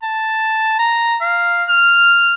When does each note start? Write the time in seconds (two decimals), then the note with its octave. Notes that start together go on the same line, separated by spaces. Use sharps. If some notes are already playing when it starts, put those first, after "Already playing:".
0.03 A5
0.79 A#5
1.21 F5
1.69 F6